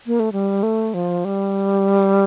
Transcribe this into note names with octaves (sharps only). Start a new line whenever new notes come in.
A#3
A3
G3
A3
F3
G3